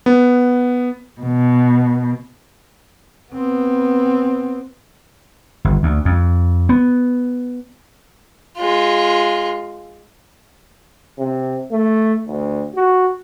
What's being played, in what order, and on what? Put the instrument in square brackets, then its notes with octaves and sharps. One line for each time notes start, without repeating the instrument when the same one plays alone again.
[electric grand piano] B3
[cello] B2
[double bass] B3 C4
[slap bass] G1
D2
F2
B3
[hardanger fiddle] G#3 F4
[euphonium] C3
A3
D2
F#4